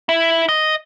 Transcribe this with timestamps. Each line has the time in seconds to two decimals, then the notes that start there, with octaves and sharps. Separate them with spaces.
0.09 E4
0.49 D#5